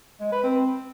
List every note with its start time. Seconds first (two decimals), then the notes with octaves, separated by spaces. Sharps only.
0.21 G#3
0.32 B4
0.44 C4